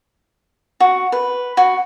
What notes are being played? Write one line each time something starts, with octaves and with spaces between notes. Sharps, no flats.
F#4
B4
F#4